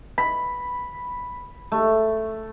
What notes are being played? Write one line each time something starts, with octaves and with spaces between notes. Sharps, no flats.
B5
A3